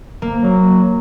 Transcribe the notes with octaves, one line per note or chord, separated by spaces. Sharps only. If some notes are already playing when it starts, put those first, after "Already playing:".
A#3
F#3